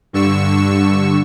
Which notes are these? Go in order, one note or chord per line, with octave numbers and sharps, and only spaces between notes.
G2 D3 C#6 E6